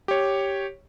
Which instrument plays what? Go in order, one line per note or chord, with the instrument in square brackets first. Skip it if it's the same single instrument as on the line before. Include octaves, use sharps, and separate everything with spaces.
[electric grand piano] G4 C#5